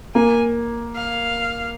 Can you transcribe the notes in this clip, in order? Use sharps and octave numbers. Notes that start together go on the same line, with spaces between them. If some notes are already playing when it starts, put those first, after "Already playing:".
A#3 G#5
F5